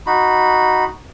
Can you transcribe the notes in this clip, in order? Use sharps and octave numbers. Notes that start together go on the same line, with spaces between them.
D#4 F#4 B5